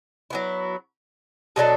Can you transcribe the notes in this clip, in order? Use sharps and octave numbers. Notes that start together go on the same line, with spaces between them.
F#3 B3 E4
B2 F#3 D4 A4